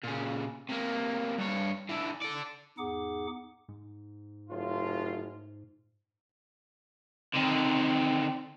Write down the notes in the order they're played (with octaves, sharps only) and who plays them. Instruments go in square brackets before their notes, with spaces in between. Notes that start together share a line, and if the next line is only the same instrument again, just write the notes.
[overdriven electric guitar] A#2 C#3
C3 A#3
G2 C#5
D3 E3
A4 D5
[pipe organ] E2 G#2 D#4 G#4 F#5 D6
[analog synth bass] G#2
[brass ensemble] F#1 A2 F4
[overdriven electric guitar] D3 D#3 [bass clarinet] C4